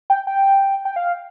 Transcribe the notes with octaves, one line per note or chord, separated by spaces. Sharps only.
G5
G5
G5
F5